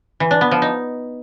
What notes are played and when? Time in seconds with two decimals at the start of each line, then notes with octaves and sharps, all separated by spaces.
0.20 E3
0.31 D4
0.41 B3
0.51 F3
0.62 D#4